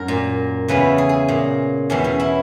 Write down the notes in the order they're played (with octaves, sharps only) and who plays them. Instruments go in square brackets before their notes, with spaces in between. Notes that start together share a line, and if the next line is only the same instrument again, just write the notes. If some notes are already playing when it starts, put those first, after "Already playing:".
Already playing: [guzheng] F#2 A#4
A#2
E2 C#3 E3 B4
G#4
G#4
A#2
E2 B2 C#4
C#4
E4